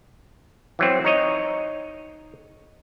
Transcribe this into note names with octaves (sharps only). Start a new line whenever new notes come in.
E3 F#3 C4
D#4 C#5 D#5